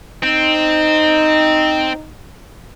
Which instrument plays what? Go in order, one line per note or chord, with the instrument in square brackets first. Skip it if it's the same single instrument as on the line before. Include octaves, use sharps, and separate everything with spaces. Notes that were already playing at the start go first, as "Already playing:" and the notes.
[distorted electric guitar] C4 [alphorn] D#4